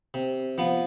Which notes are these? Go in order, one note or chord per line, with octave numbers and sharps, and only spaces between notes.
C3
F3 B3